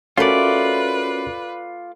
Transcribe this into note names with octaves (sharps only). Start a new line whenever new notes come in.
A3 C#4 F4 F#4 A#4 B4 C#5 D5